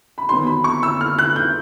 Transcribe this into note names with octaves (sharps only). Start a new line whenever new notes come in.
B5
D#3 F#3 B3 C6
B5
C#6
E6
F6
F#6
G6